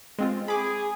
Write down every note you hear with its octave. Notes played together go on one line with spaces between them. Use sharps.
G#3 C4 F4
G#4 B5 D6